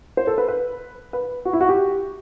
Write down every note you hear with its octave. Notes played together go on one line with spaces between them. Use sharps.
C5
A4
B4
B4
B4
F#4
E4
F#4
G4